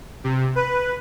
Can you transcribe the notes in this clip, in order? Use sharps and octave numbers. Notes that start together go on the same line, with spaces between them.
C3
B4